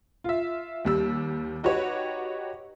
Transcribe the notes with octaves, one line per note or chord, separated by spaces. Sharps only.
F4 E5
D#2 G3 E6
D#4 F#4 G4 B4 C#5